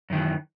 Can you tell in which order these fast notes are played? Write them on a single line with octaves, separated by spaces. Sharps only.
F#2 D#3 E3